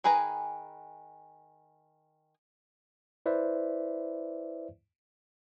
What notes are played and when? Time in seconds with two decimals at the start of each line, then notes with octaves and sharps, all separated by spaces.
0.04 D#3 G#4 B4 G#5 A#5
3.26 E4 B4 C5 D5 E5